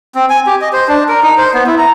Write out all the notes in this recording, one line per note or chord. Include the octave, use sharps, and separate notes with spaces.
C4
G#5
G4
D#5
C5
D4
A#4
D#4
C5
B3
E4
A#5